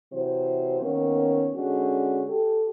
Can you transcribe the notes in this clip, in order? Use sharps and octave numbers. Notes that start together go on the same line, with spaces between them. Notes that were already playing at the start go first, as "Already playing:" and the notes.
C3 E3 F#3 C5
D#3 A#3 B3 C#4
D3 G#3 C#4 F#4
G4 A4